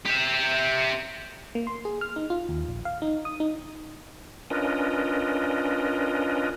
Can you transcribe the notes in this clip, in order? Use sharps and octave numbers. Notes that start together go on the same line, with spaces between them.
G4 E5
A#3
C6
G#4
F6
D#4
F4
D#2
A#1
F5
D#4
D#6
D#4
C#4 D4 F4 A#4 B4 D#5